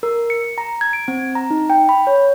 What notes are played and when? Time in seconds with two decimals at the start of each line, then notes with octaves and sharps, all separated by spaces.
0.03 A#4
0.30 C#7
0.58 A#5
0.81 G#6
0.93 D7
1.08 C4
1.35 A#5
1.51 D#4
1.70 G5
1.89 B5
2.07 C#5